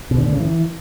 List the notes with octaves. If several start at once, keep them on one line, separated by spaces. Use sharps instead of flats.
B2
D3
A2
C#3
E3